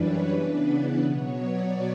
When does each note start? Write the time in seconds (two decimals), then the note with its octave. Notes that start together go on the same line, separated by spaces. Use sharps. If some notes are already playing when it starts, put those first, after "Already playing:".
Already playing: F#2 E3 G3 D4 B4 C#5
0.30 C#3 E3 B3 D4 B4
1.04 B2 F#3 B3 C#5
1.41 D5